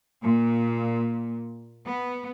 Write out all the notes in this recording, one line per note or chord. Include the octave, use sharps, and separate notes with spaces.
A#2
B3